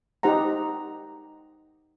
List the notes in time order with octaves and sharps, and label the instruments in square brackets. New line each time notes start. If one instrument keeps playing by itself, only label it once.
[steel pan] D#4 G4 C5 F#5 A#5